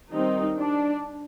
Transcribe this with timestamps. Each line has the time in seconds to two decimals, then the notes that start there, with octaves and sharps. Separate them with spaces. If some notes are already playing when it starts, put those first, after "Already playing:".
0.12 D#3 G3 C4 D#4
0.58 D4